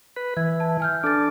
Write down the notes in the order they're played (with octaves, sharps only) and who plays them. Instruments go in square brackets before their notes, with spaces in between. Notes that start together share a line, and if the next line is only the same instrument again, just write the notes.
[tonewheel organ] B4
[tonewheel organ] E3 [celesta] G#6
[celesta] A5
G#5 F6 G6
[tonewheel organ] D4 [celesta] A4 A6